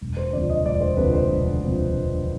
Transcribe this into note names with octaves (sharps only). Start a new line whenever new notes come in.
E1
C5
D2 C3 F3 D5
D#5
E1 D5
C5
D2 C3 F3 B4
C5
E1
D2 C3 F3
E1